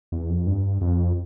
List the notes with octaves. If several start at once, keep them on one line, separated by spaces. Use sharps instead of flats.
E2
F2
G2
F2